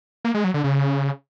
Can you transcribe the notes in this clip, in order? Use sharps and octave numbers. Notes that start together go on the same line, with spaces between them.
A#3
G#3
F#3
D3
C#3